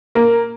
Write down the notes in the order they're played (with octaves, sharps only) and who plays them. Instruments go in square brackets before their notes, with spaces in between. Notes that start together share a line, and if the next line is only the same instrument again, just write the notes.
[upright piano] A#3